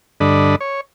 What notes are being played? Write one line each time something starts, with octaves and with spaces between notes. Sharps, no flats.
G2 D3 D4 A4 D#5 B5
C#5